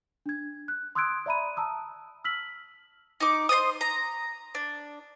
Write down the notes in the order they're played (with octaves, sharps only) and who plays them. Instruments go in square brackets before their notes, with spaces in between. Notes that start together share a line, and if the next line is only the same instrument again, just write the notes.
[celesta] D4 G#6
F#6
C6 D#6 E6 F#6 G#6 D7
D5 E5 A#5 B5 D#7
A5 A#5 D#6 E6
E6 F6 B6 F#7
[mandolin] D#4 D6
C5 D5 D#5 D#6
A#5
D4